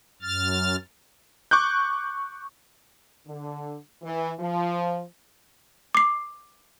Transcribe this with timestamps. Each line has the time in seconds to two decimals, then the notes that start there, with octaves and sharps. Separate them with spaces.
0.22 F#2 F6 A6
1.51 C#6 D6 F#6 G6
3.27 D3
4.03 E3
4.40 F3
5.95 D6 C7